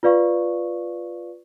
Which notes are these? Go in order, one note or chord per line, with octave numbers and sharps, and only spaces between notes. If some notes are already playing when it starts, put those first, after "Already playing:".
F4 B4 D5 F5 C#6